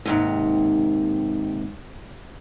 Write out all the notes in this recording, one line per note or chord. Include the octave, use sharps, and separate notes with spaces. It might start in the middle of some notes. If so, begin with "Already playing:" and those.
D#2 G#2 C3